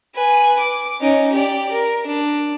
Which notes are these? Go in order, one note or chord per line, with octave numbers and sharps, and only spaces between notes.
B4 G#5
D6
C#4 D#4
G4 D5
A#4
D4